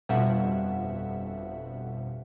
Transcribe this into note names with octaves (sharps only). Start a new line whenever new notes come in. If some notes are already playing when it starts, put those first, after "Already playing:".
G1 F2 B2 G3 E5 F#5